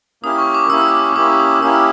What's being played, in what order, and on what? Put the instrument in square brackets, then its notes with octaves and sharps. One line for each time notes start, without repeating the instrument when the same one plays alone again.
[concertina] A#3 C#4 E4 G4 [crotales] D#6
[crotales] C#6
D6
[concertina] A#3 C#4 E4 G4 [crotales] E6
[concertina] A#3 C#4 E4 G4 [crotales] D6
[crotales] D#6
[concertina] A#3 C#4 E4 G4 [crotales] E6